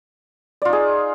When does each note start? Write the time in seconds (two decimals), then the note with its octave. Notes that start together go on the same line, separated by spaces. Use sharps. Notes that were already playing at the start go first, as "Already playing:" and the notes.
0.62 D5
0.65 F4
0.69 D#4
0.73 G#4